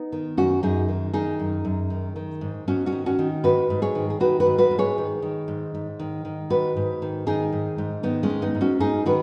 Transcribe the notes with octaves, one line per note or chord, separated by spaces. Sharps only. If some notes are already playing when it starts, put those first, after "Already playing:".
Already playing: B3 D#4
D#3
F#2 C#4 F#4
F#2 D#4 G#4
D#3
D#3 D#4 G#4
F#2
F#2
D#3
D#3
G#2
G#2 C#4 F#4
C#4 F#4
D#3
C#4 F#4
D#3
G#2 F#4 B4
G#2
G#4 C#5
D#3
G#4
D#3 F#4 B4
F#4 B4
G#2
F#4 B4
G#2
G#4 C#5
D#3
D#3
G#2
G#2
D#3
D#3
G#2 F#4 B4
G#2
D#3
D#3 D#4 G#4
G#2
G#2
D#3 B3 D#4
G#3 C#4
D#3
B3 D#4
G#2
C#4 F#4
G#2 D#4 G#4
D#3 F#4 B4